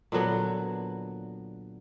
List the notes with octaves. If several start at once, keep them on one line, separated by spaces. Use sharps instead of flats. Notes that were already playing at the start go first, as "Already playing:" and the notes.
A#2 D3 F#3 B3